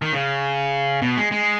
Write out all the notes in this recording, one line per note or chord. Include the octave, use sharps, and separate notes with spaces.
D#3
C#3
B2
G#3
G#3